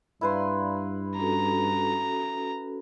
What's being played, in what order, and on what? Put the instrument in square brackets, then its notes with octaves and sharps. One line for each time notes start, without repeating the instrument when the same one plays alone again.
[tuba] G2 [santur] E4 B4 C6 [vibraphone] D5 F5 A#5
[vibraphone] C#4 F#4 A4 [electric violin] A#5